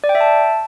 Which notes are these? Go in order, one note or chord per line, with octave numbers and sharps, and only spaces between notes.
D5
G5
E5
A5